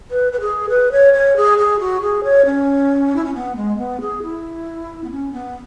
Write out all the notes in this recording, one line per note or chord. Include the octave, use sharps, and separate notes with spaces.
B4
B4
G#4
B4
C#5
C#5
G#4
G#4
F#4
G#4
C#5
C#4
E4
C#4
B3
G#3
B3
G#4
E4
B3
C#4
B3